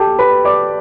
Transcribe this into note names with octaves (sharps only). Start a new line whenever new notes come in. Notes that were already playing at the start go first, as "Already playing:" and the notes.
Already playing: G4 A4 G5 A5
B4 B5
D5 D6